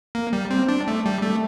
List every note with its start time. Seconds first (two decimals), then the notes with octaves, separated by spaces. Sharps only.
0.15 A#3
0.33 G3
0.50 C4
0.68 D4
0.88 A3
1.06 G3
1.23 A3